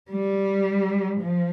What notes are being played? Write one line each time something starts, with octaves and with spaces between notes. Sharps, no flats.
G3
F3